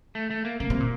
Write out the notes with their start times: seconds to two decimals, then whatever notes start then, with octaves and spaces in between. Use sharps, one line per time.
0.15 A3
0.31 A3
0.45 A#3
0.60 C#3 A#3
0.70 C3
0.80 A#2